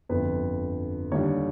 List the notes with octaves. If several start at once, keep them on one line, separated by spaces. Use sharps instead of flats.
G1 F2 D3 B4
D#2 D3 G3 C#5